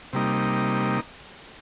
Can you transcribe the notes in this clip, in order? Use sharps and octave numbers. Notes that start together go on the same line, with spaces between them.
C3 G3 A#3 D#4